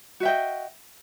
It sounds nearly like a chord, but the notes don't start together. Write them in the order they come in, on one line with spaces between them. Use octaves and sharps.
F#4 E5 G5 D#5